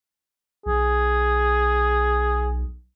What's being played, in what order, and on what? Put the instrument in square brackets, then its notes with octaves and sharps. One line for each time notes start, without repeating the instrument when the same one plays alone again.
[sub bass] B1 [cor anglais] G#4